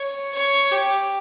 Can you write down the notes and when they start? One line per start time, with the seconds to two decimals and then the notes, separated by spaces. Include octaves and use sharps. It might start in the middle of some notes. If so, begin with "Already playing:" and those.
Already playing: C#5
0.34 C#5
0.71 G4